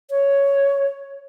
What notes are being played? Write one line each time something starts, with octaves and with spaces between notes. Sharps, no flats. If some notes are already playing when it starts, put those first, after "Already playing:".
C#5